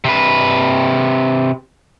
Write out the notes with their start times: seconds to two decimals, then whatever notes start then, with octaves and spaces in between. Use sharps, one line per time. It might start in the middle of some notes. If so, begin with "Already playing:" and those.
0.05 C3 B4